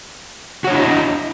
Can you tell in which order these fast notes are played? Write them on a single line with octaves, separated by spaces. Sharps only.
F#4 C#5 D4 E4 D#5